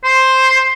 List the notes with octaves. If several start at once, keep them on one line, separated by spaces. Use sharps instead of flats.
C5